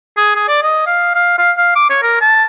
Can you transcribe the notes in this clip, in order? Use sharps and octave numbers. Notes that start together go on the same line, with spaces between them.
G#4
G#4
D5
D#5
F5
F5
F5
F5
D6
C#5
A#4
A5